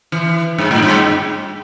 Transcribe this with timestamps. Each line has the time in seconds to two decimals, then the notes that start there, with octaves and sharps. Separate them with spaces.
0.12 E3
0.58 G2
0.71 A2
0.82 G2